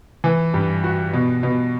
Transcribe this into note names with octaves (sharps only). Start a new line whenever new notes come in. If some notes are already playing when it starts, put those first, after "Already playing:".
E3
G2
F#4
B2
B2